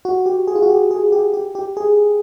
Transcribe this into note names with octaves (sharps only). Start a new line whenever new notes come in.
F#4
G4
G#4
F4
F#4
G4
G#4
G4
G4
G4
G#4